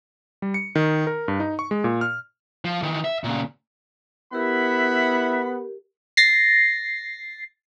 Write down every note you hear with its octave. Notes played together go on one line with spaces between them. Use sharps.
G3
C#7
D#3
A#4
G2
D#4
C#6
G#3
A#2
F6
F3
D#3 E3
E5
A#2 C#3
B3 E4 G4 A#4 E5 F#5 B5
A6 A#6 C7